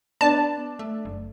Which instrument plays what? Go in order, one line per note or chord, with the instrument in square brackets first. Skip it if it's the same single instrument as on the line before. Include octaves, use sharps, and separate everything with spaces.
[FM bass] B3 [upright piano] D4 [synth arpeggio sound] A5
[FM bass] A3
F#1